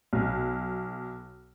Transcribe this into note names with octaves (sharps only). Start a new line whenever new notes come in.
B1